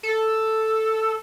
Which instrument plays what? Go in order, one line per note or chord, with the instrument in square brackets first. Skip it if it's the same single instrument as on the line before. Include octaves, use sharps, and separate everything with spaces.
[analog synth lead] A4